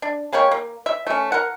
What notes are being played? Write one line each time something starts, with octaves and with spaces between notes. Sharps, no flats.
D4
G#3 A#3 G4 C#5
A#3
E5
A3 C#4
A#4 F#5